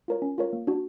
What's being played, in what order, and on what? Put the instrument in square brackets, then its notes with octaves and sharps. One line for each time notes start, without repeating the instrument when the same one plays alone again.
[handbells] F4 A#4 C#5
C#4
F4 A#4 C#5
A#3
D4 F#4